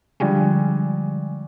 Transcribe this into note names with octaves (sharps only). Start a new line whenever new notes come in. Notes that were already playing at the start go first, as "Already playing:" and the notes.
D3 F3 G3 G#3